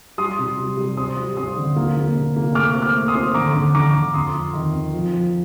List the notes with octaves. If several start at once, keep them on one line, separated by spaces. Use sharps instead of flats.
G3 C6 D#6
C3
G3
G3
C4 C6 D#6
G3
C4 C6 D#6
D3
A#3
A#3
C3
A#3
A3 D6 F6
C4
D6 F6
A3
C6 D#6
C4
D3 A#5 D6
D3
D3 A#5 D6
D3
F2 C6 D#6
F2
D#3
F2
F3
F3